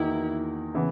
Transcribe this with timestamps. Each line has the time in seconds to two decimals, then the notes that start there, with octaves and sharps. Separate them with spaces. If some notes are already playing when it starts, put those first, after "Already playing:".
Already playing: E2 D#3 A#3 D#4 E4 F#4
0.74 C#3 E3 B3